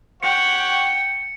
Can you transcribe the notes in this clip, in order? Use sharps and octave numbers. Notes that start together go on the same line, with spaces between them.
G4 C#5 F#5 G5 C#7